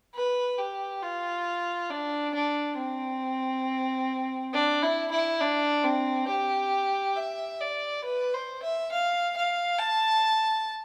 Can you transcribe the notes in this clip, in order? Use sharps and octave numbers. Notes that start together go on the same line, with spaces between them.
B4
G4
F4
D4
D4
C4
D4
E4
E4
D4
C4
G4
E5
D5
B4
C5
E5
F5
F5
A5